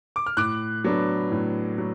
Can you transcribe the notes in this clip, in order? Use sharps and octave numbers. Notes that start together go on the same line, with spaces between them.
D6
F6
A2 D6 F#6
F#3 B3 D4
A2
F#3